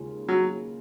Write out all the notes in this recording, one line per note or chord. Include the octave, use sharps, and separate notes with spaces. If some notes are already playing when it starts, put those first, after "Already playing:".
Already playing: D#2 C#3 G#3 F4
F#3